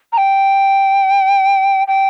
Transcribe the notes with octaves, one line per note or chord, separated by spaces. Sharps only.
A#5
G5
G5